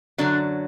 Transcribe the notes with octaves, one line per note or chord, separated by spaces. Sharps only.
F#2 D3 F#3 D4